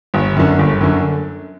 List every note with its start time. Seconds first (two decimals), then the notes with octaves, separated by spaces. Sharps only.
0.14 G1
0.36 F#2 D3
0.59 G1
0.81 F#2 D3